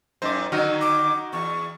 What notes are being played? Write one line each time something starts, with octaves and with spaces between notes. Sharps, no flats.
F#2 A#2 D#4 C5 D6
D3 D#3 F#3 D#4 F#4 F6
D6
E2 C#6